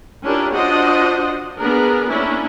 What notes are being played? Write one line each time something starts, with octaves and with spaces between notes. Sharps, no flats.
C#4 D4 E4 F4 G4 A#4
D4 F4 F#4 C5 D#5 F#5
B3 D4 G#4 A#4
A#3 C#4 D4 E4